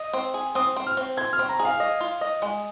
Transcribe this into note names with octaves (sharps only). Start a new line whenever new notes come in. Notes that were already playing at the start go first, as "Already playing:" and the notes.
Already playing: D#5
C4
G#4
C4 D#6
C4
F6
C4
C5 G#6
F6
C4
A#5
G#4
F5
D#5
F4
D#5
G#3